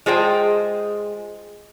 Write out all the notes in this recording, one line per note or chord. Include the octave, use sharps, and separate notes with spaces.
G#3 F4 G#4 C5 G5